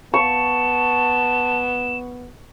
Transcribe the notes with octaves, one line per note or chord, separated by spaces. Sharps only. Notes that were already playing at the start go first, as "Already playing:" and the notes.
B3 A5 C#6 E7